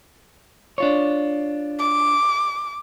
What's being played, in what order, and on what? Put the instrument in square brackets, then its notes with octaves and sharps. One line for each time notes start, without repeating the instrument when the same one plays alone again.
[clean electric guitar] D4 F4 C#5
[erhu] D6